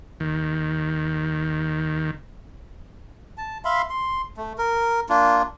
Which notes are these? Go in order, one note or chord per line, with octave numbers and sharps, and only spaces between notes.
D#2 D#3
A5
E5 F5 B5 C6
C6
A3
A#4
A#3 D4 F4